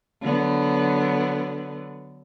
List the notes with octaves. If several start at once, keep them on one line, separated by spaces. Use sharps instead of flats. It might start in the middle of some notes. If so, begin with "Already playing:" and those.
D3 F#3 B3